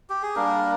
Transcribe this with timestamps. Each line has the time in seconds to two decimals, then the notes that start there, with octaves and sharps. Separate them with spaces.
0.10 G4
0.23 G#4
0.36 G3 A#3 D4 A#4